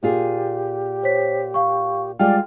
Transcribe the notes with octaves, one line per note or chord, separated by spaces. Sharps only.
A#2 F4 G4 G#4
C5 C#5 B6
F5 C#6
G3 G#3 F4 D5 G5 G#5 F6